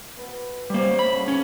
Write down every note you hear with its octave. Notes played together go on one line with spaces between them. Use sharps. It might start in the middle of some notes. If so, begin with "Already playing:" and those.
B3 B4
G3 A#3 C5 C#5
B5
C#3 B3 D4
C#4